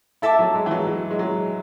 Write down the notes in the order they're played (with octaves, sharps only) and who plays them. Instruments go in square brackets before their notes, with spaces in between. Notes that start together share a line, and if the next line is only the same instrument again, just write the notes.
[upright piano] E4 [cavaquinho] A4 E5 A5 D6
[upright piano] F#3
G#3
E3
F#3
F#3
G#3
F#3